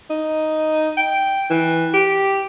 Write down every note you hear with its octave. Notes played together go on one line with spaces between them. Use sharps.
D#4
G5
E3
G4